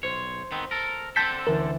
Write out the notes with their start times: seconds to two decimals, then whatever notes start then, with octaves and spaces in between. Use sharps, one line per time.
0.03 B1 C5 C#5
0.52 D#3 B3 C4
0.71 A4 A#4
1.16 D3 C4 A4 A5 G6 B6
1.47 D2 E3 C#4 A#4